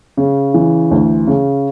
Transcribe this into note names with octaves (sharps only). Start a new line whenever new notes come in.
C#3
E3
D2
C#3